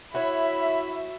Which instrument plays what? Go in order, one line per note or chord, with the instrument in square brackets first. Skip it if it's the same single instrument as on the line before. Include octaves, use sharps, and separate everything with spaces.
[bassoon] E4 [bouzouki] F#4 C#5 [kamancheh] E5 [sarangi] B5